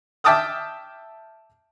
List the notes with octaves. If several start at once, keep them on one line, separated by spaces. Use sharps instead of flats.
E5 G5 A5 D6 D#6 F6